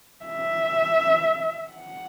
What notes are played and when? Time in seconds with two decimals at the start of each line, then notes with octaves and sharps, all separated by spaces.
0.25 E5
1.70 F#5